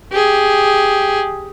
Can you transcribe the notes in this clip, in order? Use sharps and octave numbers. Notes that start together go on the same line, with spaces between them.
G4 G#4